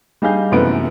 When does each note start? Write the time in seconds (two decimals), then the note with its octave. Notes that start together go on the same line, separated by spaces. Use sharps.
0.22 G3 D#4 G#4 F5 G6
0.52 F#2 C3 E3 A3 B3 D7